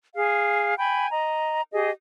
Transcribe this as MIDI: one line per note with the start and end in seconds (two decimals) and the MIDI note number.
0.14 0.74 68
0.14 0.74 77
0.78 1.06 79
0.78 1.06 80
0.78 1.06 83
1.11 1.61 75
1.11 1.61 82
1.72 1.89 67
1.72 1.89 68
1.72 1.89 75